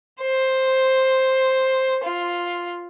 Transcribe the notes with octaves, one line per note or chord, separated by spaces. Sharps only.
C5
F4